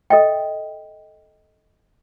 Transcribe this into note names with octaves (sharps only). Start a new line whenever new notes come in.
A4 D#5 E5 G5